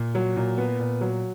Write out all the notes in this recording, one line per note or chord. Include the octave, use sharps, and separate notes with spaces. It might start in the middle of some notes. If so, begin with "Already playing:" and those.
Already playing: A#2
F#3
A#2
B3
A#2
F#3